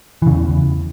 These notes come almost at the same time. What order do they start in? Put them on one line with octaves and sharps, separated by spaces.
E3 C#3 E2